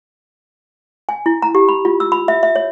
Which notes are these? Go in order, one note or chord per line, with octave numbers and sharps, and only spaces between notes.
G#5
E4
A#5
G4
B5
F4
E6
B5
E5
E5
C#5